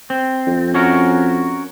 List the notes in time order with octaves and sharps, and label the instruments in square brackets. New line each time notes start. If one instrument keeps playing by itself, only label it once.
[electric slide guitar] C4
[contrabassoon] F2
[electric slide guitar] C#4 F#4 A#4